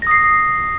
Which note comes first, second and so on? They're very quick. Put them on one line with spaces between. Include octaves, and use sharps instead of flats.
A#6 D#6 C7